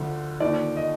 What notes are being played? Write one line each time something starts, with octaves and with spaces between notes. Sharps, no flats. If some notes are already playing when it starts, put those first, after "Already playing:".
Already playing: D2 D3 F3
D#2 D3 F3 D5
D#5